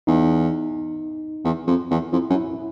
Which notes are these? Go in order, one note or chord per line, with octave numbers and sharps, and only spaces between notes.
E2 D#4
E2
F2
E2
F2 E4
F#2
E4